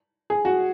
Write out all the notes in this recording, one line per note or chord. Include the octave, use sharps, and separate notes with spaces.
G#4
F#4